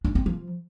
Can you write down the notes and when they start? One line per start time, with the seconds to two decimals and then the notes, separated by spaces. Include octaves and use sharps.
0.04 D4
0.15 C4
0.26 F3